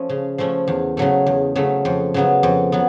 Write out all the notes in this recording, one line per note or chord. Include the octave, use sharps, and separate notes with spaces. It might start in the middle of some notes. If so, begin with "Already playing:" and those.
Already playing: F3 A3 C#4
C#3
F3 A3 C#4
E2
C#3 F#3 A3
E2
C#3 F#3 A3
F2
C#3 F#3 B3
F2
F#3 B3